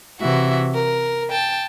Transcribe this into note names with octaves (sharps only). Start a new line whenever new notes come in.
C3 E3 F#4 E5
A#4
G5 A5